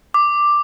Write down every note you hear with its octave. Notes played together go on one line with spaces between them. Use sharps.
D6